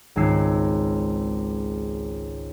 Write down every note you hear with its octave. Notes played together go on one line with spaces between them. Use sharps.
G#1 C#2 E6 C7